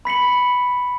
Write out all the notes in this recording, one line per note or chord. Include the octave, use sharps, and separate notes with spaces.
B5 B6 C#7 F#7